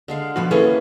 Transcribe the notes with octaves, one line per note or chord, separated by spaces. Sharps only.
D3 G#3 F5
B2 F3 F#4
E3 A#3 C#4 G#4 A4 F5